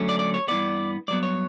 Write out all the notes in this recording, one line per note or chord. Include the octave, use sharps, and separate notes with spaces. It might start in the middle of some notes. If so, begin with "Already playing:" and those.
Already playing: D2 D3 F#3 C#4
D5
D5
C#5
G2 E3 B3 D5
G2 F#3 B3 D5
C#5